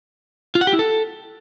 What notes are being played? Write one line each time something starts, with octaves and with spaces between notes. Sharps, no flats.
F4
F#5
G4
E4
A4